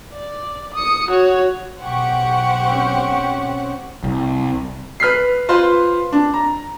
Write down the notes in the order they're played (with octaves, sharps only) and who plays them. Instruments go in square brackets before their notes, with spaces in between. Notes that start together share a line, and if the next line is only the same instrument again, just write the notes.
[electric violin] D5
D#6 C#7
F#4 C#5
[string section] B1 G4 C#6 [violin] C5 F#5
[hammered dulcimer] C4 C#4
[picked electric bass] C2
[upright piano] B4 F6 B6 C7
F4 B4 C5 C6
D4
A#5